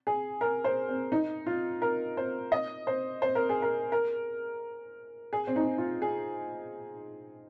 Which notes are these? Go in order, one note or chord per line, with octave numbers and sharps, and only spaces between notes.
G#4
A#4
C5
C4
D#4
F4
A#4
C5
D#5
C5
C5
A#4
G#4
A#4
A#4
G#4
C4
D#4
F4
G#4